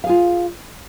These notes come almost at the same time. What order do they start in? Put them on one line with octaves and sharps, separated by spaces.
F5 G#4 F4